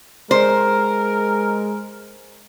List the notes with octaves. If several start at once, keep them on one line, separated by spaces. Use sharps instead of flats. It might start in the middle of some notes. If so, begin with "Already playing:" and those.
G#3 A#4 C5